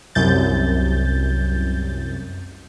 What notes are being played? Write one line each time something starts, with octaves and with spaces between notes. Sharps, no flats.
C2 F#2 G6 A6